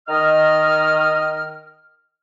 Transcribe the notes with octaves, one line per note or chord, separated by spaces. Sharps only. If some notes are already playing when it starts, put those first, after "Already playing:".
D#3 D#5 F6